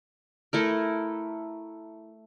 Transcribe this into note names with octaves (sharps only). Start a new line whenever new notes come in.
A3 E4 A#4